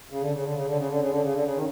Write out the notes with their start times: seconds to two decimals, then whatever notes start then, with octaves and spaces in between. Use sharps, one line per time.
0.10 C#3
0.21 D3
0.33 C#3
0.44 D3
0.55 C#3
0.66 D3
0.77 C#3
0.89 D3
0.99 C#3
1.10 D3
1.22 C#3
1.33 D3
1.44 C#3
1.55 D#3